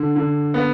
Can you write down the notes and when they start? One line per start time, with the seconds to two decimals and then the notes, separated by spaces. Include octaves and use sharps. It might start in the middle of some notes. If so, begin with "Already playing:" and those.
Already playing: D3
0.15 D3
0.54 B3